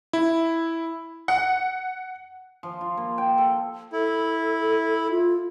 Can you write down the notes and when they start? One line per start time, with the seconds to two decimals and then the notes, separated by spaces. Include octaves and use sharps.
0.13 E4
1.28 F#5
2.63 F3
2.81 F4
2.97 A#3
3.18 G5
3.38 A4
3.93 E4 A4
5.11 F4